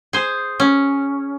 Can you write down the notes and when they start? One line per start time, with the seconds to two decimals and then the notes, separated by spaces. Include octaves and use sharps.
0.13 G#4 C5
0.60 C#4